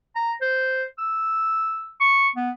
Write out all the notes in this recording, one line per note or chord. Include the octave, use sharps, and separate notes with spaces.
A#5
C5
E6
C#6
B3